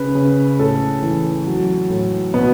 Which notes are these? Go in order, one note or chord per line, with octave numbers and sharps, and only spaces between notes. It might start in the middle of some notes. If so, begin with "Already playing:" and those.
Already playing: C#3 B4
C#3
A2 A4
E3
F#3
A2
B2 B3